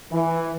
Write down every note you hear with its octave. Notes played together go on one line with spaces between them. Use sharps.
E3